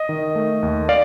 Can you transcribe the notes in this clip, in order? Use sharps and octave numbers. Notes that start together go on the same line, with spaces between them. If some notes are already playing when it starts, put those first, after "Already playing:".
Already playing: D#5
D#3
A3
D#2
D5 F5